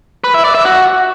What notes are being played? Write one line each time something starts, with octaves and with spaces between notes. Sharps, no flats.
B4
E5
D5
E5
F#4